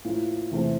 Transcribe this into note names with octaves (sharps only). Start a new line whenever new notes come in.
A2 F3 A#3 E4
E2 C3 E3 A3 C4